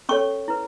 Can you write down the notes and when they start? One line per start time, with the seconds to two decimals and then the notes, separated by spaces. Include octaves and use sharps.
0.09 C#4 A4 C#5 C#6
0.48 E4 B4